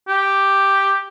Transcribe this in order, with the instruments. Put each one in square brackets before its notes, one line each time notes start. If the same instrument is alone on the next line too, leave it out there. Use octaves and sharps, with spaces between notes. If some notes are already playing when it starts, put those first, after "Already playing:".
[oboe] G4